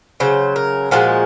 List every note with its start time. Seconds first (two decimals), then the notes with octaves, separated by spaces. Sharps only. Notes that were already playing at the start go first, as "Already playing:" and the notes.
0.20 C#3 F#3 C5
0.56 A#4
0.91 A#2 F3 G#3 F#4